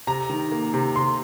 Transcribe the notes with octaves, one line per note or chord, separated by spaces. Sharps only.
C3 A#5
D#3
A#3
C3
C3 C6